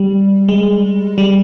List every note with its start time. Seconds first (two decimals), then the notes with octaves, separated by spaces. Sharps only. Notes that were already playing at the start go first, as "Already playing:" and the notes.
Already playing: G3
0.48 G#3
1.18 G3